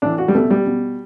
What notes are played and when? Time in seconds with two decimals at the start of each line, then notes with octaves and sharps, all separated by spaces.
0.02 A2 E3 D4
0.18 F#4
0.28 G3
0.35 B2 A3
0.50 G3
0.67 B2